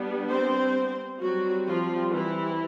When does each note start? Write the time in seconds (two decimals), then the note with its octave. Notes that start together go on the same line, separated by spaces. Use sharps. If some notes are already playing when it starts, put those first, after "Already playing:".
Already playing: G3 B3 D4
0.30 C4 C5
1.21 F#3 G3 C4 F#4
1.67 F3 F4
2.13 E3 E4